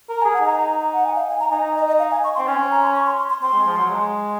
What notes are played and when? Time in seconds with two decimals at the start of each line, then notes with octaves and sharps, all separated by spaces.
0.09 A#4 A#5
0.22 G#5
0.25 G#4
0.34 F#5
0.41 D#4 A#5
0.94 F#5
1.05 G#5
1.16 F5
1.29 G#5
1.40 A#5
1.52 D#4 G#5
1.76 D#5
1.87 D#5
1.99 F5
2.11 G#5
2.24 C#6
2.35 C6
2.39 C4
2.48 C#4 G#5
2.71 A#5
2.83 C6
2.95 C#6
3.06 C6
3.18 C6
3.30 C6
3.42 C4 C6
3.54 G#3
3.66 F3
3.78 F#3
3.90 G#3